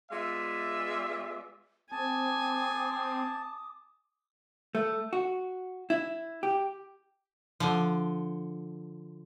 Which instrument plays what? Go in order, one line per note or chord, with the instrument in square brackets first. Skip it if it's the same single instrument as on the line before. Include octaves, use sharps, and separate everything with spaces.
[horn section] G#3 B3 F4 D5 E5
[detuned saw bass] C4 [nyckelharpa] G#5 [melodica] A5 [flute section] D6 D#6
[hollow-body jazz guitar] A3
F#4
E4
G4
[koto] D3 F3